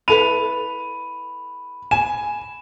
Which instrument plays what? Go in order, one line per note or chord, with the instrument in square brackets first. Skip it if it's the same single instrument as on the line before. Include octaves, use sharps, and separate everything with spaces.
[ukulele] E4 A4 B4 [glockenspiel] B5 [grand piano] D#7
[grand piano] G#5 [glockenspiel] E7